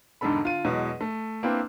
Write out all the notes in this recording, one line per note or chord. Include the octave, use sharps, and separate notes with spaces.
E1 G#2 D3 D4 A4 B5
D3 F4 D#7
E2 B2 E3 F#3 G#3
A3
A#3 C4 D4 E4 B4 G5